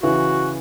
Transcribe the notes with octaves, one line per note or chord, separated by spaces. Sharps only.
C#3 E3 F#4